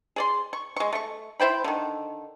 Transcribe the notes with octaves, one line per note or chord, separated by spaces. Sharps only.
G#4 D5 C6
C#6
G#3 C#6
A3 C#6
E4 C5 G5 B5
D3 D#3